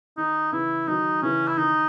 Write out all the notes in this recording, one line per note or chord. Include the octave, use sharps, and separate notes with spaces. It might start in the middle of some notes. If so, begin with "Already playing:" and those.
D#3 D#4
C#3 E3 E4
D#3 F#3 D#4
C#3 E3 C#4
E4
D#3 D#4